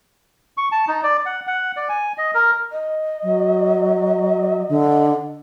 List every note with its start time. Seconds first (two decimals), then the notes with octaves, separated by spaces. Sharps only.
0.57 C#6
0.72 A5
0.88 D#4
1.03 D5
1.26 F#5
1.47 F#5
1.77 D5
1.89 G#5
2.18 D#5
2.35 A#4
2.72 D#5
3.23 F#3
4.69 D3